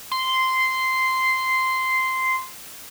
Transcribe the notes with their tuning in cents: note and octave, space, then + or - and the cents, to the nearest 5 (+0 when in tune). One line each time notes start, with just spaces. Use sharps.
C6 -10